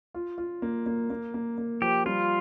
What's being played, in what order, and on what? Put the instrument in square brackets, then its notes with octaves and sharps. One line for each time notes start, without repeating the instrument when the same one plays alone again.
[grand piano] F4
F4
A#3
A#3
A#3
A#3
A#3
[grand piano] F3 [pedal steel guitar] G4
[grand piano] G3 [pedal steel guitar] F4